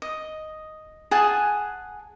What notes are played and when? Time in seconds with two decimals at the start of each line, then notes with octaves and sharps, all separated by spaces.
0.02 D#5
1.11 G#4 F#5 G#5 A5